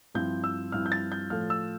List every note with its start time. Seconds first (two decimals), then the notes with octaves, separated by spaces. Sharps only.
0.15 G2 F3 C4 E4 G6
0.44 E6
0.72 G2 F3 C4 E4 F6
0.86 G6
0.92 A6
1.12 G6
1.30 A2 F3 A3 F6
1.50 E6